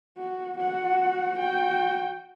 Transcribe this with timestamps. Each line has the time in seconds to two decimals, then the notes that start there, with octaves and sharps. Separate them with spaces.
0.17 F#4
0.58 F#4 F#5
1.39 F#4 G5